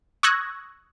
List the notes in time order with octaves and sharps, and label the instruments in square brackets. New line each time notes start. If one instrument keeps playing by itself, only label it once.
[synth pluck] C#6 D#6 E6 F#6 G#6 A#6